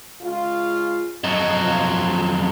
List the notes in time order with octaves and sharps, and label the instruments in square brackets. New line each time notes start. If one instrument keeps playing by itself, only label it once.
[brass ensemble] C#3 G#3 F4
[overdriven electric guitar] F2 F#3 [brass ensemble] D#5
[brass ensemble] F3